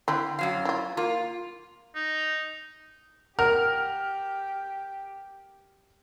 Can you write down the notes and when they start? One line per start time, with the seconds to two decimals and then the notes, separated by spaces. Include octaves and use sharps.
0.08 D3 C4 E4
0.39 F#2 F#3 F5
0.65 E4 F4
0.97 A#3 F4
1.96 D#4
3.39 G4 A#4 F#5 F6